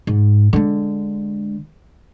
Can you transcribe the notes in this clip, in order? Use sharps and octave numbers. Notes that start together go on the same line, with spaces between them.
G#2
D3 G#3